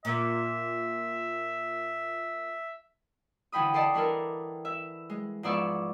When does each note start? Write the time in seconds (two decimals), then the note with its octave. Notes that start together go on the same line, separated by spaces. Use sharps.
0.05 A#2 E5
3.52 D3 E3 G5 B5 D#6
3.74 A4 C5 D5 D#5 A5
3.94 E3 D4 A4 A#4
4.65 E5
5.10 G#3
5.43 G#2 F3 B3 D5 E5 C#6